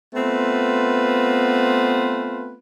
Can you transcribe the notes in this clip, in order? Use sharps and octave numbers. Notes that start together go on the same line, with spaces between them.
A3 B3 C4 F4 B4